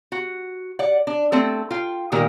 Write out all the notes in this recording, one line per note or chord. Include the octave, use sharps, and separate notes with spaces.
F#4
D5 F#5
D4
A3 C4 A4
F4 G5
A#2 D#3 G3 A#3 A#4